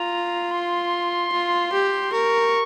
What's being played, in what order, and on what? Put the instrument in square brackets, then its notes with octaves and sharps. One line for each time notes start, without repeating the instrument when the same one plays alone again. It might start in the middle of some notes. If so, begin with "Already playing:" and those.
Already playing: [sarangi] F4 [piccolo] A#5
[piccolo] C6
[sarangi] F4
G4
[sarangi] A#4 [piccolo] C#6